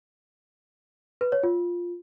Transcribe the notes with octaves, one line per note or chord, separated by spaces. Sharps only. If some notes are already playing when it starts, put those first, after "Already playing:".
B4
C#5
F4